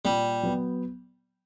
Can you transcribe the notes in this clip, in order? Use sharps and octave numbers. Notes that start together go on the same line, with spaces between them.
A#2 G3
F#3 B3